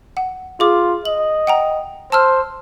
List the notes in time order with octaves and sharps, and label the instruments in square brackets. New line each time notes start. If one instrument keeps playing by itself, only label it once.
[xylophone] F#5
[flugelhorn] F4 [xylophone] G#4 D6
[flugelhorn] D#5 [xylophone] F#7
[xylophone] F#5 G5 A#5
[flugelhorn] C5 [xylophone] A5 E6 F6